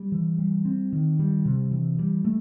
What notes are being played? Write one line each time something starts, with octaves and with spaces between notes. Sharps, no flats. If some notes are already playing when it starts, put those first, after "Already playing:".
Already playing: G3
E3
G3
C4
D#3
G3
C3
E3
G3
A3